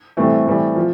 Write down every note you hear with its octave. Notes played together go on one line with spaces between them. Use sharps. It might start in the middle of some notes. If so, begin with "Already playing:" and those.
A2 E3 G3 A3 C4
A2 E3 G3
F3